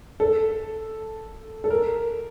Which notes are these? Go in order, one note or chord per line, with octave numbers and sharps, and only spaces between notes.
A4
A4
A#4